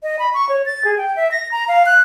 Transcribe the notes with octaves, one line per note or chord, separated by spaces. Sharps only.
D#5
B5
C#6
C#5
A6
G#4
G5
E5
A#6
A#5
F5
F#6